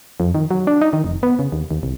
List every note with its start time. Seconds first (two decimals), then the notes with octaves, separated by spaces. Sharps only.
0.20 F2
0.35 D#3
0.51 F#3
0.67 D4
0.81 D#4
0.93 D#3
1.04 F1
1.23 B3
1.39 C#3
1.52 D#2
1.71 D#2
1.83 C2